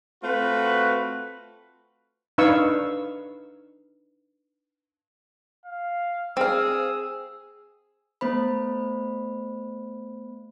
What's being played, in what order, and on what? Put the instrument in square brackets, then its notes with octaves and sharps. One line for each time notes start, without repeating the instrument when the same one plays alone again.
[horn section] A3 C4 F4 F#4 B4
[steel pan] D4 D#4 B4 F5 C#6 E6
[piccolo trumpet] F5
[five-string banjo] C4 F5 [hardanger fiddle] G#4 [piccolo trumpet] E6
[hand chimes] A3 B3 C5 B5